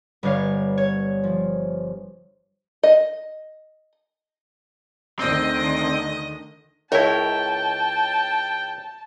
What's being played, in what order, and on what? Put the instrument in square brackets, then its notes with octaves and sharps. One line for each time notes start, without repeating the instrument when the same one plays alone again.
[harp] G1 G3 B4 C#5 F5
C#5
F3
[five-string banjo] D#5
[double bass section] D2 D3 D#3 [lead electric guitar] C4 [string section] D#5
[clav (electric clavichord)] C#2 E4 [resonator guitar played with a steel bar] A#4 C#5 [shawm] G5 [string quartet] A5